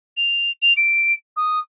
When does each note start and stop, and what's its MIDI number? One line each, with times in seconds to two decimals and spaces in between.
0.17 0.51 101
0.62 0.73 101
0.77 1.13 98
1.37 1.59 87